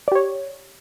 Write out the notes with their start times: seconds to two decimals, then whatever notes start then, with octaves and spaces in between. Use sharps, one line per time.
0.08 D5
0.12 G4
0.15 C#5